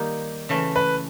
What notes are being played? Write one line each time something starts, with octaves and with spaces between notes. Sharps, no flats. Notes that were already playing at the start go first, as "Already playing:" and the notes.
Already playing: D#3 G3 A#3 D#4 G4
C#3 E3 A3
B4